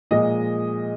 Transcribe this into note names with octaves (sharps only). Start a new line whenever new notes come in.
A#2 F3 G#3 D#5